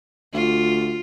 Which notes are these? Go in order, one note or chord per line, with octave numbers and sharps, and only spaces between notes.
D2 F4